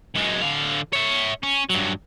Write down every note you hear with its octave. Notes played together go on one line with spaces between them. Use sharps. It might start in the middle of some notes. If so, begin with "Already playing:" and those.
F#2 G#3
D3 F5
C#5 E5
C#4
G2 F#3